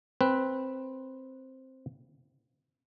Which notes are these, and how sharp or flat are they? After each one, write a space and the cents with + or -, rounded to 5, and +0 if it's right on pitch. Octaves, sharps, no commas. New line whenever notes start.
C4 +5 B4 +0